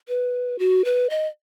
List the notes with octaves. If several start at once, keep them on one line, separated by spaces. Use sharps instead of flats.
B4
F#4
B4
D#5